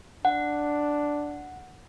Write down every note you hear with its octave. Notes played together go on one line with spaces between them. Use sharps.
D4 F#5